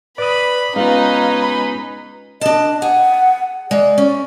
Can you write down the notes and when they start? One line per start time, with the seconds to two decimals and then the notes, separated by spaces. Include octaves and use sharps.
0.18 B4 D5 B5 D6 D#6
0.76 G#3 B3 C#4 D#4 F4 B4 F5
1.42 B5
2.41 D4 D#5 A5
2.82 G#4 F#5
3.71 G#3 D5
3.98 C#4